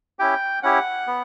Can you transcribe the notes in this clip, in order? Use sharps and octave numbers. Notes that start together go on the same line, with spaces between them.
C#4 E4 G4 G5
C#4 E4 G4 F#5
B3